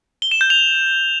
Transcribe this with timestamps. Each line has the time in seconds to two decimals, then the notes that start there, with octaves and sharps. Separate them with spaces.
0.22 G7
0.31 E7
0.41 G6
0.50 F7